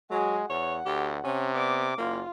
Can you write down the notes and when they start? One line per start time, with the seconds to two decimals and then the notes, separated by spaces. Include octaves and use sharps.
0.11 F#3 G#3 F#4 G#4
0.49 E2 C#5 F#5
0.86 D2 G4
1.24 C3 C#4
1.55 B3 D5 D6
1.98 F#1 A#3 F4